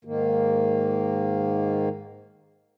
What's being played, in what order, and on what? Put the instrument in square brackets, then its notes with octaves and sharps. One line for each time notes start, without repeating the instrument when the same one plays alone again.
[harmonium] G#2 D#3 A#3